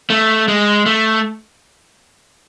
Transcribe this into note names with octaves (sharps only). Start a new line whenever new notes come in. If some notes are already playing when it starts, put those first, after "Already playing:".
A3
G#3
A3